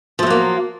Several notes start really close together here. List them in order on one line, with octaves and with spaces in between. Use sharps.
F3 A3 F#3 A#3